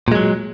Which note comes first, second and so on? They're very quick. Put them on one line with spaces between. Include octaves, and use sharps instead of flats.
A#2 G#3 F#3